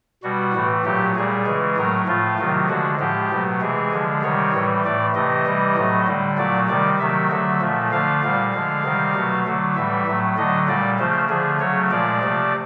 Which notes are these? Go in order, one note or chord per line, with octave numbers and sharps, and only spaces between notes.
B2 G3 F#4
A2 E3 A3
A#2 F#3 A3 G4
A#2 G3 G#4
C#3 E3 G#3
A2 F#3 A3 A#4
A2 F3 A3 F4
C3 D#3 F#3 A3
D3 F3 G#3 F#4
A2 F3 G#3 G4
B2 F#3 A3
C3 E3 G#3 G#4
D3 F3 G#3
C3 D#3 G3 C#5
A2 E3 G3
A2 E3 A3 D5
C3 E3 A3 D#5
C3 E3 G3
A2 F#3 A3
D3 G3
A#2 F#3 A3 D5
C3 D#3 G3 D5
C3 D#3 F#3 A3 E5
D3 F#3 A3
A#2 F3 A3
D3 F3 A3 F5
A#2 G3 F5
D3 F3 G#3 F5
C3 D#3 G3
B2 F#3 A3
D3 F#3 A3
A2 E3 G3 E5
A2 F#3 A3
D3 F#3 A3 D#5
A#2 G3 D5
C#3 F3 A3 C5
D3 F3 A3 G#4
C#3 F#3 A3 C#5
A#2 F3 G#3 D5
C3 F3 A3